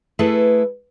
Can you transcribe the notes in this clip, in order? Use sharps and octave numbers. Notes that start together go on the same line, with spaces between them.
A3 E4 G#4 A4 B4